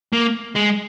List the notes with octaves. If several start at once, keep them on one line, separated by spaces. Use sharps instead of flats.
A#3
G#3